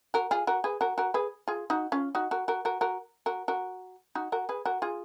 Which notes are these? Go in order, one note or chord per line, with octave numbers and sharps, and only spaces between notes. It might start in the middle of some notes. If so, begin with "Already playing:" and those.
F#4 A#4
F4 G#4
F#4 A#4
G#4 B4
F#4 A#4
F#4 A#4
G#4 B4
F4 G#4
D#4 F#4
C#4 F4
D#4 F#4
F#4 A#4
F#4 A#4
F#4 A#4
F#4 A#4
F#4 A#4
F#4 A#4
D#4 F#4
F#4 A#4
G#4 B4
F#4 A#4
F4 G#4